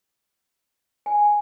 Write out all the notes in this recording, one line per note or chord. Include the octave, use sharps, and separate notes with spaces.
G#5